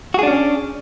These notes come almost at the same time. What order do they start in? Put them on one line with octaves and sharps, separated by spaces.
F#4 G#4 D4 C#4